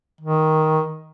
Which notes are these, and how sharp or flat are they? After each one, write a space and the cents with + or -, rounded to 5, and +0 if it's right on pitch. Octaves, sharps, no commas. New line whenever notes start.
D#3 +10